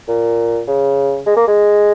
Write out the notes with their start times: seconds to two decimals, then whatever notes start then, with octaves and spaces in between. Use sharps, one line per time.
0.08 A#2
0.67 C#3
1.26 G#3
1.36 A#3
1.47 G#3